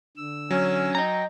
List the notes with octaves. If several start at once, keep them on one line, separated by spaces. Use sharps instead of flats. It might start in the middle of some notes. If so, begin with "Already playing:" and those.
D3 E6
F#3 C#4
D#5 G5 A#5